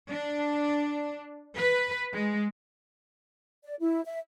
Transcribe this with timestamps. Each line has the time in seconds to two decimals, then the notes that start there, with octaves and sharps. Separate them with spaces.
0.10 D4
1.57 B4
2.13 G#3
3.64 D5
3.80 E4
4.05 E5